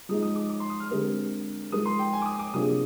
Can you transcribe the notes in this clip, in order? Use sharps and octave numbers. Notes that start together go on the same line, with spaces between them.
F3 G#3 D#4 D#6
D#6
D6
D6
C6
D#6
F6
D3 G#3 C4 G4 A#4
F3 G#3 D#4 A#4 D#6
C6
G5
G#5
D6
D#6
D6
C3 F3 A#3 D4 G#4 D#6